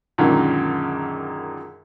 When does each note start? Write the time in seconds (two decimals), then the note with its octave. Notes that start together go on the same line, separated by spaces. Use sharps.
0.18 F#2 A#2 D3 D#3 G#3